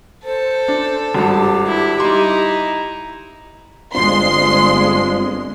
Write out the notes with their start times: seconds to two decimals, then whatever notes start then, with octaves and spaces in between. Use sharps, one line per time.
0.24 A4 C5
0.68 D4
1.15 G#1 G2 G4
1.66 E4
2.00 G3 D#4 E4 C6
3.94 G1 G#3 C4 D4 F4 C6